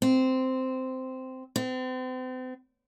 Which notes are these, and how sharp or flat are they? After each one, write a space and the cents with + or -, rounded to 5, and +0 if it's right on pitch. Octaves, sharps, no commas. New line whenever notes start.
C4 -10
C4 -40